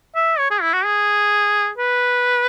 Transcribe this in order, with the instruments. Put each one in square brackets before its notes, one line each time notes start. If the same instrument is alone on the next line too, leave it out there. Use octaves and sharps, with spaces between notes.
[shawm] E5
C#5
G#4
E4
F#4
G#4
B4